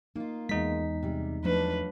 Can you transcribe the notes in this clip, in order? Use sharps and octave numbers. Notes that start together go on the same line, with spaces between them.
A#3 D#4 F4
E2 G#3 D#4 B6
C3 G3
F3 F#3 A3 D4 B4